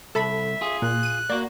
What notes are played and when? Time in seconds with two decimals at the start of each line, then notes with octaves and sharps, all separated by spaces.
0.15 C2 A4 E5 A5 B5
0.61 F4 G#4
0.82 A#2 F#6
1.03 D#7
1.30 A#3 F#4 D5